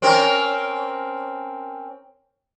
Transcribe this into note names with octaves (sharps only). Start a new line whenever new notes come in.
C4 C#4 A#4